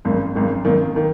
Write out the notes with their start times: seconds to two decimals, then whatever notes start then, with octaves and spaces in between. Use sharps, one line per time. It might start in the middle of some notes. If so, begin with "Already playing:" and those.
0.05 G#1 F#2 D#3 A#3
0.35 G#1 F#2 D#3 A#3
0.65 G#1 F#2 D#3 A#3
0.96 D#3 A#3